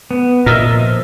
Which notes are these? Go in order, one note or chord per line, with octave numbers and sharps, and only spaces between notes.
B3
A#2 A#4 D#5 E5
F3